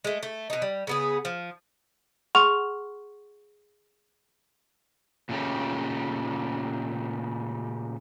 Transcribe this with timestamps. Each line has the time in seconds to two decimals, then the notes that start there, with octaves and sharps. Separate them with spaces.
0.04 G#3 A3
0.23 A3
0.50 B2 D#4
0.62 G3
0.87 C#3 B3 G#4
1.25 F3
2.35 G#4 F#5 C6 C#6 F6 F7
5.29 A#2 C#3 A3 C#4 D#4 G4